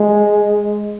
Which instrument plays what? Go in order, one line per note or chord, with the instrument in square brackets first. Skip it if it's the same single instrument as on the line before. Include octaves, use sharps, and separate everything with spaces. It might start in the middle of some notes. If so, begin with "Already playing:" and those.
Already playing: [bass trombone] G#3